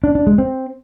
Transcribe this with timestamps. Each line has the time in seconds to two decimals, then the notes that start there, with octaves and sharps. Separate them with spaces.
0.04 D4
0.15 D4
0.27 G#3
0.38 C4